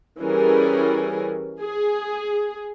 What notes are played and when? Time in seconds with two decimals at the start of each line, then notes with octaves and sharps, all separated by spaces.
0.20 E3 G3 C#4 G#4 A#4
1.60 G#4